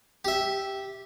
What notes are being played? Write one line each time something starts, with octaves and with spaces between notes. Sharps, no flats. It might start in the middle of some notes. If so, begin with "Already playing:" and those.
G4 E5